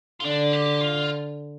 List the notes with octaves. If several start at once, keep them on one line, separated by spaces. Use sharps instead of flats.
F4
D3 D4
G4
F4